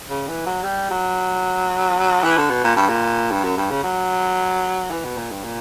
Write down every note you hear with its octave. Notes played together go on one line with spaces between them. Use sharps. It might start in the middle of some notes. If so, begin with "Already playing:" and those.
C#3
E3
F#3
G3
F#3
E3
D3
B2
A#2
G2
A#2
G2
F#2
G2
C#3
F#3
E3
B2
A#2
G2
A#2